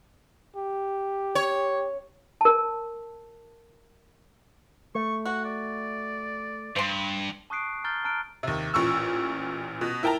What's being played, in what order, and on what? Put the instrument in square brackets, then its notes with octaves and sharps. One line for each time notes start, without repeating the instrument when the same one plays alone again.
[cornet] G4
[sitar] C#5
[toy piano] A#4 A5
[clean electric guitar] A3 [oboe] C#6
[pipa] F#4 [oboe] F#5
[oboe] D5
[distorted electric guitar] G2 [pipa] C5 C6
[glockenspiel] A5 C#6 D#6 F#6 C7 D7
A#5 F6 G6 A6 G7
A5 A#5 F6 F#6 D7
[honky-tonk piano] D#2 C3
A1 A#2 C#6 E6
B2
E4 A#4 G5 A5 A#5